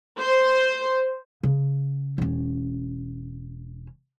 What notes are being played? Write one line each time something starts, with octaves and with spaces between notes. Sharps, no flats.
C5
C#3
E1 C#4